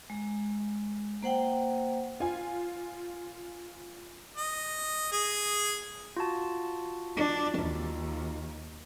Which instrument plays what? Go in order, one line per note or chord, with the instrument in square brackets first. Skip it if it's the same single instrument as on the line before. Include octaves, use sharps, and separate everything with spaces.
[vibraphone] G#3
A#3 C5 F#5 G5
[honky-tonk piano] F4 G#5
[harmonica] D#5
G#4
[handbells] F4 F#4 A5
[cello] D4
D#2